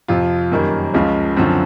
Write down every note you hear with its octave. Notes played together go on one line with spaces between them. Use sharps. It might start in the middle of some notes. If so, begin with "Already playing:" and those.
F2 C3 F3 F4
F#2 D#3 G3 A#3
C#2 C#3 F3 G#3
F#2 D3 F3 C4